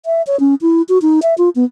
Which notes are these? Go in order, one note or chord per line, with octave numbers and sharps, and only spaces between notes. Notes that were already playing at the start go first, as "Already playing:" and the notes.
E5
C#5
C#4
E4
F#4
D#4
E5
F4
B3